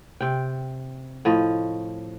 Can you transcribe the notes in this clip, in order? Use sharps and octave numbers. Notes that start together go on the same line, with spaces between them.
C3 G5
A2 F3 D#5